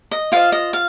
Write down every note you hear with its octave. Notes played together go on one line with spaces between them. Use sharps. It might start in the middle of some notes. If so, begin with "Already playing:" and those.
D#5
F4 C5 D#5 F5
D#5
F5